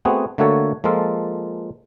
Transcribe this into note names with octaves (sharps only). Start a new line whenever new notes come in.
A3 B3 C4 F#4 G#4
D3 A3 A#3 F#4 A4 C#5
F3 G#3 A#3 F4 A4